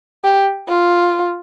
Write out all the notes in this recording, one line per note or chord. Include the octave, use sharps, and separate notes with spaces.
G4
F4